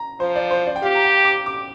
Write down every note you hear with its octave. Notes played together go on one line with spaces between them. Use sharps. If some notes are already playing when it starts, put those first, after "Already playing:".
Already playing: A#5
F3 C5
D5
C5
D5
G5
G4 F5
A#5
G5
D6
D6